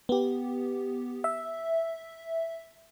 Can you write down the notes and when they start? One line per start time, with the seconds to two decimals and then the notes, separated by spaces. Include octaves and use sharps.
0.09 B3 G4
1.24 E5